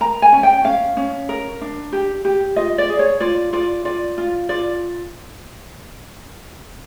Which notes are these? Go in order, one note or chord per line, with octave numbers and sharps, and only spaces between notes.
A#4 A#5
G#5
C#4
G5
C#4 F5
C#4
A#4
D4
G4
G4
F4 D#5
D5
G#4
C#5
F4 D5
F4 D5
F4 D5
F4
F4 D5